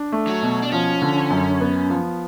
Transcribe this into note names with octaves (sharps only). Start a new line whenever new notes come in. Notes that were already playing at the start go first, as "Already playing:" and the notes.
Already playing: D4
A3
F#3
B2
D4
F3 C#4
D3
F#2
B3
F3